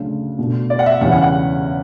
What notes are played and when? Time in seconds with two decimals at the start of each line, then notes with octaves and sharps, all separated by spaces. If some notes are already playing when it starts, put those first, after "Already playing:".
Already playing: D2 C#3 F#3 A3 D4
0.39 B2 A3 D4
0.70 D5
0.79 F#5
0.86 E5
1.01 E2 C#3 G3 C#4 E4 F#5
1.12 F#5
1.22 F#5